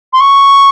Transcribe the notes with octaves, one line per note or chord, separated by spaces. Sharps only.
C6
C#6